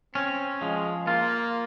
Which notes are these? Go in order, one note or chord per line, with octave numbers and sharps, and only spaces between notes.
C4 C#4
F3 G#3
A#3 F4